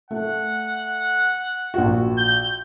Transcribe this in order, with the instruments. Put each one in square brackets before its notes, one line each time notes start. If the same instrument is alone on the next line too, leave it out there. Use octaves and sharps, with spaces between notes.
[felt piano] A3 [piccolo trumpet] F#5
[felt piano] A#1 F#4
[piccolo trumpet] G6